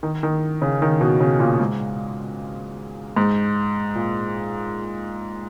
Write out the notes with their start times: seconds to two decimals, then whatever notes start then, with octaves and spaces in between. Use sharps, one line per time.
0.03 D#3
0.23 D#3
0.62 C#3
0.82 D#3
1.01 B2
1.20 C#3
1.40 A#2
1.60 G#2
3.17 G#2
3.95 A#2